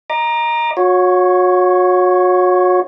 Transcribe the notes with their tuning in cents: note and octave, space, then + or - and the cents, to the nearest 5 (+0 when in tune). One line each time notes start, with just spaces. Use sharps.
D#5 +0 A#5 +10 D6 +40
F#4 -35 C#5 +0